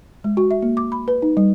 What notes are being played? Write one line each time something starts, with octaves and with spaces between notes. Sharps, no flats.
G#3
F#4
E5
A#3
D6
B5
B4
D#4
G3